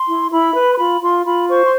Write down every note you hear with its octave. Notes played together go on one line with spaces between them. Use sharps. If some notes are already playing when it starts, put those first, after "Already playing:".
Already playing: C6
E4
E4 B5
B4
C6
F4 B5
F4 C6
F4 B5
C5 C#6
C6